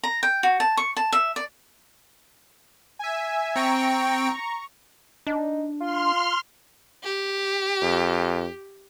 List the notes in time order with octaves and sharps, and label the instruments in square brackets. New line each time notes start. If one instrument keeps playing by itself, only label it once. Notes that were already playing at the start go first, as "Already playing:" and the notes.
[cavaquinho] A#5
G5
F#4
A5
C#6
A5
E5
D5
[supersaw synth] E5 G#5
[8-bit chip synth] C4 G5 [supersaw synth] A#5 C#6
[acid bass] D4 [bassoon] D#4
[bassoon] F4 [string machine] C6 F6
[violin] G4
[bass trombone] F2